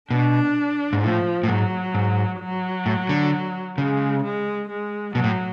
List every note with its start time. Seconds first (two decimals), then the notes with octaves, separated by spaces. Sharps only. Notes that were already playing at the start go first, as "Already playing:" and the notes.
0.11 B2 D4
0.93 G#2
1.02 A2 F3
1.43 A2
1.48 G#2 F#3
1.94 G#2
2.40 F#3
2.86 A2
3.09 D3
3.78 C#3 G#3
4.23 G#3
4.69 G#3
5.15 B2 F#3
5.24 A2